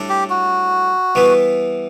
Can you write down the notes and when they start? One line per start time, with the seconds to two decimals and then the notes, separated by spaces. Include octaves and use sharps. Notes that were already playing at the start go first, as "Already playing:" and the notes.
Already playing: A2 G3 D4 A4
0.09 G4
0.30 F#4
1.15 E3 G3 B3 E4 B4